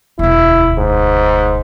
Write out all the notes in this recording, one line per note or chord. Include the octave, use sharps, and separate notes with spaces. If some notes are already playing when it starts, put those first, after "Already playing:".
E1 D2 E4
G#2